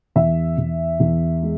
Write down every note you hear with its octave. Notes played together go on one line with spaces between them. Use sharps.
E2 E5
E2
E2
G#3